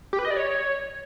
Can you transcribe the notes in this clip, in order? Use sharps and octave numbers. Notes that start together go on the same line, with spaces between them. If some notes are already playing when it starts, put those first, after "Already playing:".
G4
B4
D#5
D5
C#5